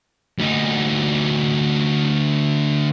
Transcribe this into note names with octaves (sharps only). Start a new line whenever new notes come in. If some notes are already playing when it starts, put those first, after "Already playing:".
D2 D#4